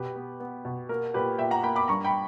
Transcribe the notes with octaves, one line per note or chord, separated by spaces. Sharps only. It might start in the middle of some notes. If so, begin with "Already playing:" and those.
Already playing: B2 G4 B4
B3
B3
B2
A#3 A#4
A#2 G4 B4
A#2 E5 G5
F#5 A#5
A#3 G5 B5
B5 D6
G2 A#5 C#6
G5 B5